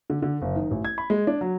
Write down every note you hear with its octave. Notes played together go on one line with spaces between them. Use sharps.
D3
D3
F#1
D#3
A1
G#6
B5
G#3
D4
F#3